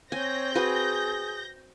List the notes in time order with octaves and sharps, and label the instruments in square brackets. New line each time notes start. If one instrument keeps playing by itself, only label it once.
[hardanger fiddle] C4 [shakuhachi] C#5 [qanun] G#5 [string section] G6 A#6
[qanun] F#4 B4 G#5 [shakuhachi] G#4